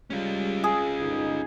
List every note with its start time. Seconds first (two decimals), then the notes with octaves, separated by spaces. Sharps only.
0.10 G3 G#3 C#4 F4
0.64 G#4
1.00 G1 D#4